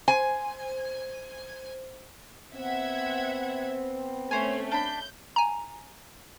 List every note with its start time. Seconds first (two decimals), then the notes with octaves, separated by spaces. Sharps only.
0.08 C5 G#5
2.55 B3 C4 E5 F#5 G#6
4.31 A3 C#4 C5 C#5 G#5
4.71 D4 B5 G6
5.36 G#5 A#5